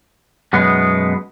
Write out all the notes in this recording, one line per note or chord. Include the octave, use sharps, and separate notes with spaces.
F#2 B2 G#3 B3